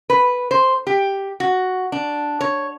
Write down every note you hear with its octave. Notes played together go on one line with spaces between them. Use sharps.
B4
C5
G4
F#4
D4
C#5